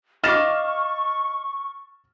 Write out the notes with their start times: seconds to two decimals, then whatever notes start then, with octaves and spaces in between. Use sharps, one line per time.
0.24 D#5 F5 C#6 D6 F6 A6 E7